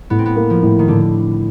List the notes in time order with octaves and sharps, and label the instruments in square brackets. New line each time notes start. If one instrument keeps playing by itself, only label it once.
[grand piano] A2 [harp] B3
[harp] C4
B3
[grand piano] A#3
[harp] F3
[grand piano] A2
[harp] D#3
[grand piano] A2 [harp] D3